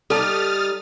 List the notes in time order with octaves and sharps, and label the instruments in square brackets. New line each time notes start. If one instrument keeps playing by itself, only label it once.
[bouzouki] G3 D#4 [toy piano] A4 A5 [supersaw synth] D#6 F6 A6